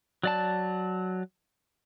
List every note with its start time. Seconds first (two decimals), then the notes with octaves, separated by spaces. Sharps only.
0.23 F#3 D5 A5